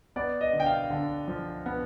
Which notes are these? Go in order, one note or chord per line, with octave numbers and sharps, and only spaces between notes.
B3 D5
D#5
D3
G5
F5
D3
F3
B3